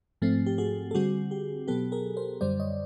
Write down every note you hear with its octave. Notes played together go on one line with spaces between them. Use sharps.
G#2 F3 A3 C4
G4
F#4 G#4
A4
D3 G3 C4 F#4 G#4
G4
B2 F#3 B3 G4 A4
G#4 A#4
A#4 C5
F#2 D3 G3 C5 D5
C#5 D#5